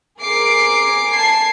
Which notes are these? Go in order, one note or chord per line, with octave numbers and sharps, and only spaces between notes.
G#4 A#4 D6 C7 D7
A5 G#6 C7